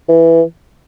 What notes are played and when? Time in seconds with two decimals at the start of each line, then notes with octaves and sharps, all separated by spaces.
0.08 E3